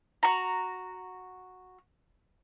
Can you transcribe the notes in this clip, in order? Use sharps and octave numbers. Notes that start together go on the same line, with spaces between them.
F#4 A#5